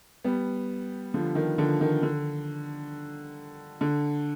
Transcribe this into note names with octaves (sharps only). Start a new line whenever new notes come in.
G3 B3
D3 F3
D#3
D3 F3
D#3
D3
D3